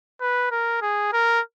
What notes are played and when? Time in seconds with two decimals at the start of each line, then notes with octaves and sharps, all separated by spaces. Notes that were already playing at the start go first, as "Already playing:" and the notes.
0.21 B4
0.51 A#4
0.82 G#4
1.13 A#4